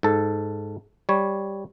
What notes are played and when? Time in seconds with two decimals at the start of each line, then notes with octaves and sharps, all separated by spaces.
0.03 G#2 A4
1.09 G3 C#5